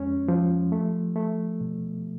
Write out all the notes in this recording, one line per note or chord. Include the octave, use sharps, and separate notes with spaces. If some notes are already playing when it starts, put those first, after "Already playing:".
Already playing: F2 G#3 C#4
F3
A3
A3
B2